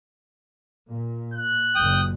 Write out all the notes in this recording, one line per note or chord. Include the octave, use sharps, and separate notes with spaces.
A#2
F#6
F#1 A#2 G5 D#6